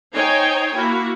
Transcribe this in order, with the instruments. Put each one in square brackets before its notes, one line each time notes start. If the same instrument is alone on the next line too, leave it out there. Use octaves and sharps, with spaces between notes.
[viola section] D#4 C5 C#5 G5 G#5
A#3 E4 F#4